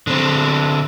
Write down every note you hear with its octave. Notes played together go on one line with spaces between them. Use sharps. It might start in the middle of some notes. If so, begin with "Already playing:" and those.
D3 C4